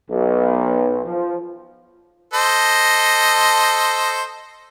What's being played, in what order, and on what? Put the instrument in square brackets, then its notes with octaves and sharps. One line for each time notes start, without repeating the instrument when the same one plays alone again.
[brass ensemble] B1
F3
[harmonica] A4 C5 D#5